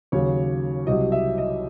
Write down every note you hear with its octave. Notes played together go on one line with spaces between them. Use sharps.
D#2 C#3 F#3 C#5
C2 C3 F#3 D#5
E5
D#5